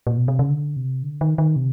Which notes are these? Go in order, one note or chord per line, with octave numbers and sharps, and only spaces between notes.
A#2
B2
C3
C#3
D3
C3
D3
D#3
D#3
C3